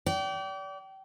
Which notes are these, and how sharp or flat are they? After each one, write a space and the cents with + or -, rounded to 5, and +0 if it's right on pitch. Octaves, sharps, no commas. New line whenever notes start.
D5 -35 G5 -30